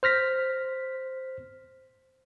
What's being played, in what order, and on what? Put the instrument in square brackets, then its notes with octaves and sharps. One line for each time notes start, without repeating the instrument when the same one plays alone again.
[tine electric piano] C5 F6 A#6 B6